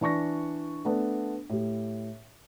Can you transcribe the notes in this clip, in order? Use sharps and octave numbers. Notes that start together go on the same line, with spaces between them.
E3 D4 C#6 A#6
A3 B3 D4
A2 G4